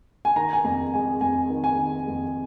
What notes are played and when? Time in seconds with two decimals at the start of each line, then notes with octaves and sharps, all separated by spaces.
0.25 G#5
0.36 D#3 A#5
0.53 G#5
0.64 F2 A#5
0.94 G#3 G#5
1.21 F2 G#5
1.50 D#3
1.64 G#5
1.78 D#3
2.07 F2